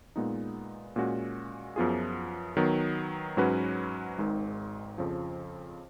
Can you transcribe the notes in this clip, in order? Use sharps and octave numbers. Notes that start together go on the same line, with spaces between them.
A#2 G#3 B3 D#4
A#2 G#3 C#4 F#4
F#2 F3 B3 F4 G#4
D#3 F#3 B3
G#2 F#3 C#4 F#4 B4
G#1 G#2 D#3 G#3
F2 C#3 F3